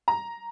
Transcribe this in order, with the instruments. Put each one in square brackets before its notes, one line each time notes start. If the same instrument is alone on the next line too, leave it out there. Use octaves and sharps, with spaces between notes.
[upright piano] A#5